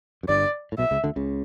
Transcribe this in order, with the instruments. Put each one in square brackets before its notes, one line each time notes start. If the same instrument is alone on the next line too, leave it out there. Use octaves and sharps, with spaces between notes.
[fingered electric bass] F#2
[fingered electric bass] G1 G2 [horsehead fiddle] D5
[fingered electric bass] A2
[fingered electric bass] B1 B2 [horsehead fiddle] E5
[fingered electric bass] C#2 C#3
D2 D3
C#2 C#3